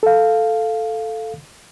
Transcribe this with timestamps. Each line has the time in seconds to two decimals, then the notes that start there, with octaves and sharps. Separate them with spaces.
0.03 A4 F5